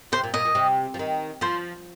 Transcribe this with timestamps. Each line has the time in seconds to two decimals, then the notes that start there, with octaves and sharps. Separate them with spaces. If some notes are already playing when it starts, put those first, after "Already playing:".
0.12 C3 C5
0.23 A#2
0.34 A#2 D#5
0.45 A#2
0.55 C3
0.94 F3
0.99 D#3
1.41 F3 C5